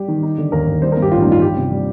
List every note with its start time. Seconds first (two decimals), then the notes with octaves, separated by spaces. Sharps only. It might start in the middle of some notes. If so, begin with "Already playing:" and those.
Already playing: G3 G4
0.08 D#3
0.23 D#4
0.38 D3
0.52 D#2 A#4
0.67 D#2
0.82 G3 C5
0.92 A#4
0.97 G2
1.02 G4
1.12 A1 F4
1.22 G2 D#4
1.32 F4
1.41 G3 G4
1.56 C3
1.71 G3